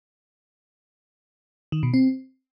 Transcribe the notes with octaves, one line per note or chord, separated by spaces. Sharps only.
D#3
B2
C4